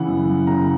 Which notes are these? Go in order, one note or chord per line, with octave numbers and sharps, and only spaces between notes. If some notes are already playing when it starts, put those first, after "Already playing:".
Already playing: C#3 E3 F#5
F#2
F#2
C#3 A#5